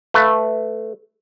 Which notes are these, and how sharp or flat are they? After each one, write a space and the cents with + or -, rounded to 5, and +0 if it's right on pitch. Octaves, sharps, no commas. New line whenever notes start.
A3 +0 B4 +15 F5 +0